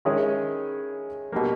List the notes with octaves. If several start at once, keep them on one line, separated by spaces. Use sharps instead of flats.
D#3 G#3 C#4 E4 G#4
B2 G3 A#3